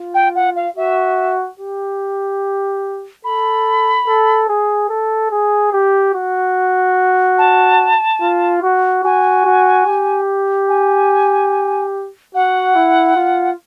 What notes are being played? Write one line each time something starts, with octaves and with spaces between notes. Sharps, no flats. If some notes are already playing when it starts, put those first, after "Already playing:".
Already playing: F4
G5
F#5
F5
F#4 E5
G4
A4 B5
A4
G#4
A4
G#4
G4
F#4
A5
F4
F#4
F#4 G#5
F#4
G4
G#5
F#4 F#5
E4
F4